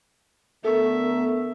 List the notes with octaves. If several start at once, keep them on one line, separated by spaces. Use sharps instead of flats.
D3 A3 B3 A4 A#4 E5 C#6